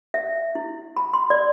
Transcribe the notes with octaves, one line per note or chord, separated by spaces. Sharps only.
E5
E4
B5
C6
D5